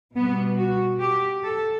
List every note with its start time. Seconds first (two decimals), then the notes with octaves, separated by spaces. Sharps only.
0.15 B2 G3 B3
0.59 F#4
1.01 G4
1.45 A4